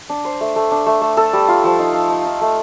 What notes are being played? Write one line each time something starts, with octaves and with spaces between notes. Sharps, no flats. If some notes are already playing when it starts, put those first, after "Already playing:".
D4
C5
A3
A3
D4
A3
A3
A4
G3
F4
F3
D#4
F5
D#4
D#4
A3